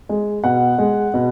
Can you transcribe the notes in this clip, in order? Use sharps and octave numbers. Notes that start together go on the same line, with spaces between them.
G#3
B2 F#5
G#3
B2